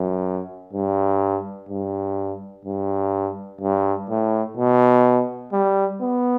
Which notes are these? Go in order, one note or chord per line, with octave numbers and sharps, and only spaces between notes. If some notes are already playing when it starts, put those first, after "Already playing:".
Already playing: F#2
G2
G2
G2
G2
A2
B2
G3
B3